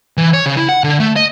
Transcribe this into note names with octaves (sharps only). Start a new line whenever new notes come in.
E3
C#5
C#3
E4
F#5
D3
A3
D#5